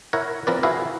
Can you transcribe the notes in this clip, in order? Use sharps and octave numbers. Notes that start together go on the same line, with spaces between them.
E4 A#4 C#5 F#5
F3 C4 A#4 B4 D5
E4 F#4 G#4 B4 E5 F5